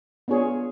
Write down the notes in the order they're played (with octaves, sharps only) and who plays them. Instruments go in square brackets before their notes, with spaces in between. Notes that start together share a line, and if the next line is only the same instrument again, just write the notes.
[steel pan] B3 D4 F4 G#4 C#5